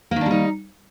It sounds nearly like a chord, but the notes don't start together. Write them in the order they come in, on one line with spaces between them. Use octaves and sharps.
A#3 D#3 D4 G3 D#4